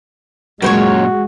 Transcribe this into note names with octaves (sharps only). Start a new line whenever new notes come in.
F#2 A#2 G#3 F#4 A#4 C5 C#5